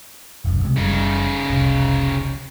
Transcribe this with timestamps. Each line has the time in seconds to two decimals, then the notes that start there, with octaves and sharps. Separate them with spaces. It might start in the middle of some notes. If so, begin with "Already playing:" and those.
0.45 F1 B1 F#2
0.63 C3 G#3
0.77 F#1 C#3 G3 D#4
1.50 F1 C2